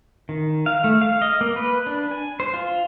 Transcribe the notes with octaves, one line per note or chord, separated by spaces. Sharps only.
D#3
F5
A3
F5
D#5
A#3
B4
D4
G#5
C5
F4